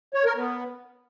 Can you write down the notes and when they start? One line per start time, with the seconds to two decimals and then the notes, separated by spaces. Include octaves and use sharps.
0.14 C#5
0.25 A#4
0.36 B3